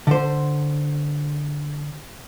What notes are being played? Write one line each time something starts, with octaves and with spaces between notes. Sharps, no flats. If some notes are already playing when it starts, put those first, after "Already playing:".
D3 C5